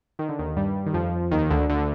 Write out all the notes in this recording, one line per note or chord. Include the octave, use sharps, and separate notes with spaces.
D#3
D3
D#2 D#3
G2 G3
D#3
F2 F3
D#2 D#3
D2 D3
D2 D3